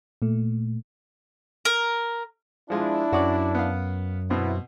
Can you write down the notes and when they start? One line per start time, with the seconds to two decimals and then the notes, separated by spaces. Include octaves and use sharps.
0.22 A#2 A3
1.65 A#4
2.70 F3 G#3 D4 E4 F4
3.13 F#2 F#4 C#5 D5
3.54 B3 F5
4.30 B2 B3 C4 E4